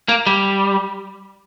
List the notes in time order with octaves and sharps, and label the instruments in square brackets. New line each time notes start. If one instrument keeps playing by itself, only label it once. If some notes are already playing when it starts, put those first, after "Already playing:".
[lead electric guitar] A#3
G3